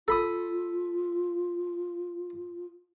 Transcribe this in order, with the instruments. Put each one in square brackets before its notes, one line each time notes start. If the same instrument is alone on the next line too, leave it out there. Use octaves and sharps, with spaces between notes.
[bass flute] F4 [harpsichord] A4 B5 D#6